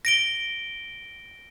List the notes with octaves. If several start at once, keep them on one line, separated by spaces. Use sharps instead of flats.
A#6 D7 G7